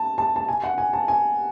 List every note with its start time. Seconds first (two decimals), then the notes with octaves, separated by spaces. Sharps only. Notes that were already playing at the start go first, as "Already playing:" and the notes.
Already playing: A5
0.18 A5
0.36 A5
0.48 G#5
0.64 F#5
0.78 G#5
0.93 A5
1.08 G#5